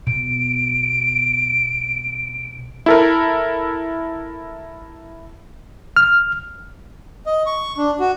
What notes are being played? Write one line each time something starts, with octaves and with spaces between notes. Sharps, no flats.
B2 D7
E4 A4 A#4
F6
D#5
C#6
D4
F#4